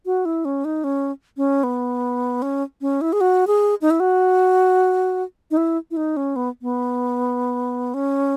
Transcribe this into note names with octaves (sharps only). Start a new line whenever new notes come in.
F#4
E4
C#4
D#4
C#4
C#4
B3
C#4
C#4
E4
G#4
F#4
G#4
D#4
E4
F#4
D#4
E4
E4
D#4
C#4
B3
B3
C#4